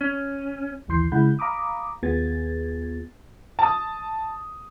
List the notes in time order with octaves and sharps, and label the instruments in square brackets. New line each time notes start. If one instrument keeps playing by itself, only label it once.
[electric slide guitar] C#4
[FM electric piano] A#1 D#2 E3 C6 G6 C7
C#3 G#3 E4 F#5 B5 G6
F5 A#5 B5 D6 D#6
D#2 B3 F4 G#4 G#6 A6
[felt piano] A5 D#6